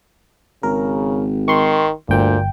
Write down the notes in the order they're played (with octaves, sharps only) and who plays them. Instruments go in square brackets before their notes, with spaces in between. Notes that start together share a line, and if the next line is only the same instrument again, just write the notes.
[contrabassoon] G#1 [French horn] C#3 [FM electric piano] A#4
[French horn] D#3 [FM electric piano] C6 C#6
[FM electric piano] G1 G5 [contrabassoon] D2 [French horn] A#2